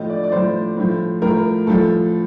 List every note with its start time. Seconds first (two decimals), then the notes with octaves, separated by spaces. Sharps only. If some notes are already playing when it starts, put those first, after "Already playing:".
Already playing: A2 F3 D#5
0.10 D5
0.24 D5
0.32 A2 F3 C5
0.77 A2 F3
1.22 A2 F3 A#4
1.67 A2 F3 A4